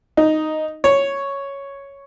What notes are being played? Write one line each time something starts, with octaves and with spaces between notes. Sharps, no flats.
D#4
C#5